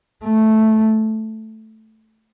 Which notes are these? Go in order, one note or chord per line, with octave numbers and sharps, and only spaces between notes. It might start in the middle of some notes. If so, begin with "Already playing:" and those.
A3